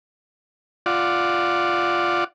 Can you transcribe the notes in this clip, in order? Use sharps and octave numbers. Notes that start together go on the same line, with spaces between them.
F4 D5 F#5